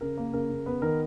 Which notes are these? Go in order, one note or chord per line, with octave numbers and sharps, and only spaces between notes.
C#3 A#4
A#3
C#3 A#4
C#3
B3 B4
D#3 A#4